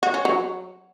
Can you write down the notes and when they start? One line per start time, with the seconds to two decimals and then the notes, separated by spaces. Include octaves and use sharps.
0.03 F#4
0.14 C#4
0.25 F#3